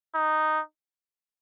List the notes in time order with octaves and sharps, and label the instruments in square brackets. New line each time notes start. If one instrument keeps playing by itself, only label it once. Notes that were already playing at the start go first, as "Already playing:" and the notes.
[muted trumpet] D#4